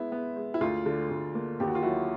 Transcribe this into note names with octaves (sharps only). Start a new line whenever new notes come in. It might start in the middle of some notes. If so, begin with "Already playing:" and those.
Already playing: G#3 B3 E4
B3
G#3
E4
D2 F4
D3
D2
A#3
D#2 G4
F#4
F4
F#3 E4 F#4